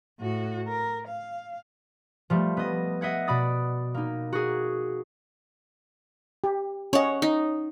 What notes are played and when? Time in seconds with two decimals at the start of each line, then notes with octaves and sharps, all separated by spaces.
0.20 A2 F#4
0.67 A#4
1.07 F5
2.30 F3 G3 A3
2.57 B3 D#5
3.01 D#5 E5 F#5 G#6
3.27 B2 D5 B5 D#6 A6
3.94 A#3 D#4
4.33 F#4 G#4
6.44 G4
6.93 C#4 C#5 D#5 F#5
7.22 D#4